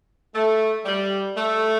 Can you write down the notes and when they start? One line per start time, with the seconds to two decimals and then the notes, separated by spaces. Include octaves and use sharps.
0.35 A3
0.85 G3
1.36 A3